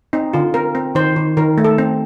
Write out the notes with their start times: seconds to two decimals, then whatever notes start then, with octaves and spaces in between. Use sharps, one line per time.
0.13 C4 D#4
0.33 D3 F4
0.54 C4 A#4
0.75 C4
0.95 D#3 C5
1.16 D#3
1.37 D#3 A#4
1.58 A3
1.64 A4
1.78 C4